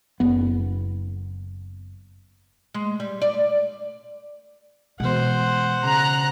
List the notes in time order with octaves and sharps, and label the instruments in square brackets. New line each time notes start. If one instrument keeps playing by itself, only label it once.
[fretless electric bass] F#1 B3
[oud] G#3
G3
D5
[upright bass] B2 [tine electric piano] E3 G#3 [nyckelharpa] C5 F#5
[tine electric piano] C#3 [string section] A#5 F#6